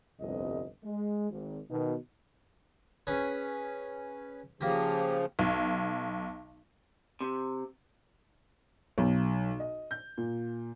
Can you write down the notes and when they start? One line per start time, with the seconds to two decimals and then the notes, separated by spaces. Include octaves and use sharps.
0.21 G1 C2 F2 D#5
0.84 G#3
1.31 G#1
1.71 B2 D#3
3.07 C#4 G#4 B4
4.61 C#3 F3 A#3 G4
5.39 B1
7.21 C3
8.98 B1
9.60 D#5
9.91 G6
10.18 A#2